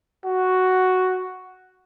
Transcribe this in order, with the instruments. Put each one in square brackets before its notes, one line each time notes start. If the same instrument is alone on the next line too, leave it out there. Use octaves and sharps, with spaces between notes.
[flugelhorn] F#4